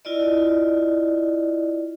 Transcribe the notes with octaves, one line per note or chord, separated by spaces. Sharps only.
E4 F4 D5 D#5